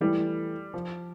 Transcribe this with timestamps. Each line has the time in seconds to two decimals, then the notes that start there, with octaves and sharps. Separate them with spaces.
0.01 E3 G3 A3 E4 A4
0.74 F3